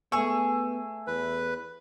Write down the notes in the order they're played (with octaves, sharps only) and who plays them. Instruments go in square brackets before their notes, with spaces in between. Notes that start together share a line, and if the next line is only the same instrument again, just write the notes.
[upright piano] A3 E6 [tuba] B3 [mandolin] G#4 C#6
[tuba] E2 [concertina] B4